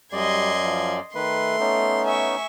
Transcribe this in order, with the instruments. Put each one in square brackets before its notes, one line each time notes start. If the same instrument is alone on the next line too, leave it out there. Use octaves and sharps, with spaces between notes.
[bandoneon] F#2 D5 [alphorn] G3 [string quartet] D#5 C6 G#6
[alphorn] F3
[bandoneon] D#3 B4 [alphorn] A3 [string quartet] C6
[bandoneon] B3 C#4 D#4
[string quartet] E5 G#5 C#6